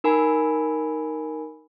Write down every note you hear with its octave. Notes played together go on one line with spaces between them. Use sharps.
D#4 A#4 G#5 B5